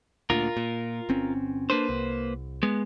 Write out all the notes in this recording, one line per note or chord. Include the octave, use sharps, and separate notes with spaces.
D2 A#2 F4 A#4
A#2
G1 C4 C#4
A#3 D4 B4 C5
C2
G#3 B3